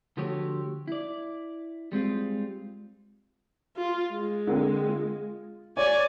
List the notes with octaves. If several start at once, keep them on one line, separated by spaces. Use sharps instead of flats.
D3 F3 A3 F#4 G4 C#5
E4 D5
G3 G#3 C4 F4
F4
G#3
D3 A#3 C4
F4
C#5 D5 G#5